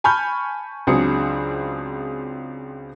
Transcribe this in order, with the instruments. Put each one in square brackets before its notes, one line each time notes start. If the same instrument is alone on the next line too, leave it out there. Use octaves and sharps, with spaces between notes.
[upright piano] G#5 A5 B5 C#6 F6 G6
C#2 F#3 C4 D4 G#4 C#7